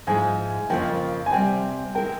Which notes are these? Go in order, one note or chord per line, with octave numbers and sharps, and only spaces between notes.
G#2 F3 G#3 E4 G#5
F2 C#3 F3 A#3 G5
G#5
C3 G3 C4 G5
G#3 E4 A#4 G5